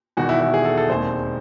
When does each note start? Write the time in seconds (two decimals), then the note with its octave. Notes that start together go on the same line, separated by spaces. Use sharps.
0.17 E1 E2 D#3 F#4
0.29 E4
0.41 E4
0.54 G#4
0.65 A4
0.77 A4
0.90 E1 D#2 D#3 G#3 C4 C5